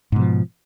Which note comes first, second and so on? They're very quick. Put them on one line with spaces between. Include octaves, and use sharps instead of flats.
G#2 B2 F3